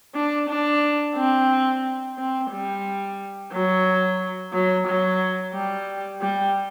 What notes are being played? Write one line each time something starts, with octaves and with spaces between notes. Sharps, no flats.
D4
D4
C4
C4
G3
F#3
F#3
F#3
G3
G3